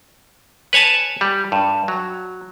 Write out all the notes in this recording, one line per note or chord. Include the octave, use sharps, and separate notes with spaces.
B4 C#5 G#5 A5
G3
G2
F#3